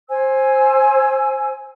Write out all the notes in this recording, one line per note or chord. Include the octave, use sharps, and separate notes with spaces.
C5 G#5 E6